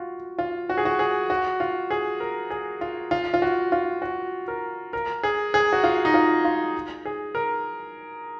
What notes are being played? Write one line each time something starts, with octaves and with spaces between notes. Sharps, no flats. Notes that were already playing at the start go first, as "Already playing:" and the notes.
Already playing: F4 F#4
F4
F#4
G#4
F#4
G#4
F#4
F4
G#4
A#4
G#4
F4
F4
F4
F#4
F4
F#4
A#4
A#4
G#4
G#4
F#4
F4
D#4
F4
F4
G#4
A#4